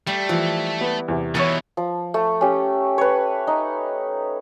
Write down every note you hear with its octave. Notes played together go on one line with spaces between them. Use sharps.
G3 A3
E3 F3
B3
E2 C3
B2 D#3 E3 B3 C#5 E6 A6
F3
A3
C#4 G4
B4 C#5
D#4